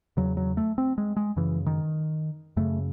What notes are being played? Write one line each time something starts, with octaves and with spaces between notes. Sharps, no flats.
E2 C#3 F#3
F#3
A3
C4
G#3
G#3
F#2 C#3 E3
D#3
F#2 C#3 A3